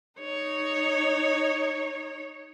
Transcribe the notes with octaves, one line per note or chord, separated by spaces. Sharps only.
D#4 C#5